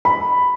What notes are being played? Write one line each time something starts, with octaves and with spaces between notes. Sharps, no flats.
B5